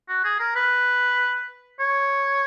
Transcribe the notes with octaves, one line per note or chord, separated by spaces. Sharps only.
F#4
G#4
A#4
B4
C#5